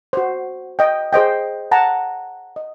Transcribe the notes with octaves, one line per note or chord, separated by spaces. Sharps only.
F#4 C5
D#5 G5
G#4 C5 D#5 G5
F#5 A5 A#5
D#5